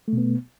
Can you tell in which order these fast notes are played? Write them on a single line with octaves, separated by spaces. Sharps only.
A3 B2 B3